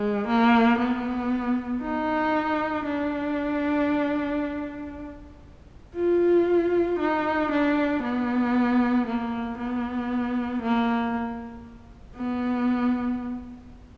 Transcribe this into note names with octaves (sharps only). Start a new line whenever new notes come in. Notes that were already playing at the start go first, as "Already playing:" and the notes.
Already playing: G#3
A#3
B3
D#4
D4
F4
D#4
D4
B3
A#3
B3
A#3
B3